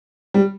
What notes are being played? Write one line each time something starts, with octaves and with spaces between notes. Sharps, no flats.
G3